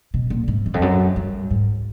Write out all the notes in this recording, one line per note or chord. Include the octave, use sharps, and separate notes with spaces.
B2
A#2
G#2
E2
F2
F#2
G2
G#2